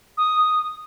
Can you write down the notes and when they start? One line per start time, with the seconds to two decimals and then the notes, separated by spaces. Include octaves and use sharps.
0.17 D#6